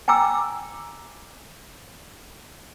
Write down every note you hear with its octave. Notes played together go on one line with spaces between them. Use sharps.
G5 G#5 A#5 D6 E6